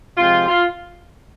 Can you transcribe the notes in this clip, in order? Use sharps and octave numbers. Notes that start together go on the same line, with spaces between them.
C3 F3 G#3 C4 F4
F4